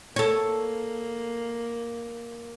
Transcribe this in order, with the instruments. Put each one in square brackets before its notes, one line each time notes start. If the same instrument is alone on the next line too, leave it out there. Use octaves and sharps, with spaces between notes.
[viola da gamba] A#3 [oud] A4 C#5